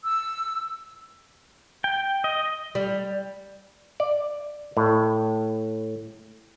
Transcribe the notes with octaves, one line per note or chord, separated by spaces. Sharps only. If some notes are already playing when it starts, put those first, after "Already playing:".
E6
G5
D#5
G3
D5
A2